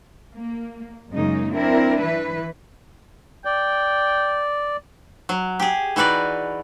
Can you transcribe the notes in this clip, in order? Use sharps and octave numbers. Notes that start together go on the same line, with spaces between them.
A#3
F#2 C#3 G#3 A#3 D#4
C4 D4 E4 A#4
E3 B4
D5 G5
F#3
G4 G#4
E3 D#4 F#4 B4 D5